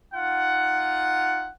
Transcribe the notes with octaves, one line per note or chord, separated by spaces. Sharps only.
D#4 F4 F#5